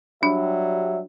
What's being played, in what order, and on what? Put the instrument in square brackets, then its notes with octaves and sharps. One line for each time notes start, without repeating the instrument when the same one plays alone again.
[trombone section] F#3 G3 [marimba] D4 [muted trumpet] E5